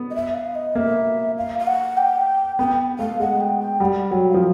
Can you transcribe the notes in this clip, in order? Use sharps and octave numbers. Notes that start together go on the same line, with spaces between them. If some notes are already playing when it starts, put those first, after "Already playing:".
Already playing: B3
D#5
E5
F5
D#5
A#3 E5
F5
F5
F#5
G5
B3 G5
A3 F5
G#3 F#5
G5
G5
G3 F#5
F#3 G5
F5
F3